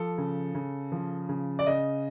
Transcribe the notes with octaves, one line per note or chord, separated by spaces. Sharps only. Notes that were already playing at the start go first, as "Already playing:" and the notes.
Already playing: F3 A4
C#3
C#3
F3
C#3
D5
C#3 D#5